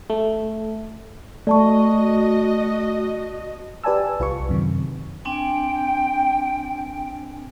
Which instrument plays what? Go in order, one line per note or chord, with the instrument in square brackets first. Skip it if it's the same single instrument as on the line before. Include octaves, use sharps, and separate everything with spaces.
[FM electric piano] A3
[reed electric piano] A3 [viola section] F#4 D#5 [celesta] D5 A5 C#6
[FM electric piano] G4 B4 D5 G#5 A5 E6
C2 F4 B4 C#6
F#2 C3 D#3
[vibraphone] C4 D4 G#5 [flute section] G5